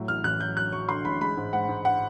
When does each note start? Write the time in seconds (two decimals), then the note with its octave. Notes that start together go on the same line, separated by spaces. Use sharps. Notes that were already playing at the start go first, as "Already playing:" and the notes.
Already playing: A2 F#3
0.08 A1 F6
0.24 A1 F#6
0.40 F#3 G6
0.57 F#3 F#6
0.72 F#3 C#6
0.89 D3 C6
1.05 A1 B5
1.21 G#3 B5
1.37 G#2
1.53 G#2 F#5
1.69 G#2
1.85 F#5